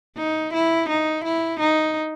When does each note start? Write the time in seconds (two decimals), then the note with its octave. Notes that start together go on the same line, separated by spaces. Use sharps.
0.17 D#4
0.54 E4
0.89 D#4
1.24 E4
1.60 D#4